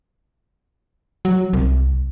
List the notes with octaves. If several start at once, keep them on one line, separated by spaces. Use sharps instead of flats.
F#3
C2